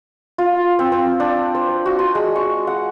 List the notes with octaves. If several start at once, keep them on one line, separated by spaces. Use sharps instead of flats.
F4
C4
C4
D4
C5
F#4
C6
G#3
C#6
F#5